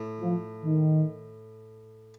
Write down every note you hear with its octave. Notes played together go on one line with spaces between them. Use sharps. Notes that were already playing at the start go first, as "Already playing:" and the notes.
Already playing: A2
F3
D#3